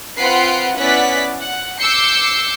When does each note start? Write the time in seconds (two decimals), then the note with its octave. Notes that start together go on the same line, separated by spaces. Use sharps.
0.18 C4 F4 B4 F#5 C7 D7
0.78 B3 C#4 E4 D5 F#5 B6
1.41 F#5
1.79 D6 E6 G6 C7 C#7